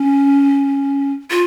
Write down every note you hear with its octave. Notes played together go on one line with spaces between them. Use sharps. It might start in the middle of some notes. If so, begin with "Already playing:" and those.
Already playing: C#4
F4